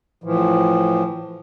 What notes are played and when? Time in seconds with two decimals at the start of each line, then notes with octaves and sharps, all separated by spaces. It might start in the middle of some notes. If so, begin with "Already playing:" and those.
0.24 A2 E3 F3